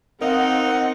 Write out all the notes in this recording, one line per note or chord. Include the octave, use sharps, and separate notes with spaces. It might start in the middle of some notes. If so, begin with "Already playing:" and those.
C4 D#4 A#4 F5 F#5